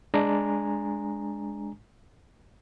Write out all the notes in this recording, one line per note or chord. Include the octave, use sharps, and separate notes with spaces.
G#3 D4 G#5 A#5